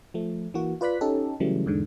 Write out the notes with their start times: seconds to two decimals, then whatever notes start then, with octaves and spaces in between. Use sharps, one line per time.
0.14 F3 A3
0.54 E3 A#3 F#4
0.81 F4 B4 D5 F#6 B6
1.01 C#4 D#4 G4 A4
1.40 C#3 E3 F#3 G3 A3
1.66 E2 G#2 D3